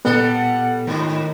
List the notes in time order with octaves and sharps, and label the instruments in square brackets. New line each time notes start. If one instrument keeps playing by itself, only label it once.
[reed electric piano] A#2 B3 [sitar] G3 A4 [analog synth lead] F#5
[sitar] G#2 [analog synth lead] D#3